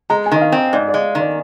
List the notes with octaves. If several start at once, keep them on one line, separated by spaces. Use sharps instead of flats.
G#3 A#5
G#5
D#3 D#5
F5
C4 D#5
G#2 D5
D5
G#3
D#3
D5